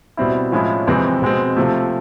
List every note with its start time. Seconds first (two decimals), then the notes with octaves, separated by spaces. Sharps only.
0.17 B2 G3 C4 E4
0.52 A2 F3 G#3 C#4 E4
0.87 F2 C3 E3 G#3 C4
1.22 B2 G#3 C4
1.57 C3 F3 A3